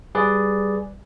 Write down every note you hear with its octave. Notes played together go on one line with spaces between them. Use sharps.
G3 G#4 B4 D5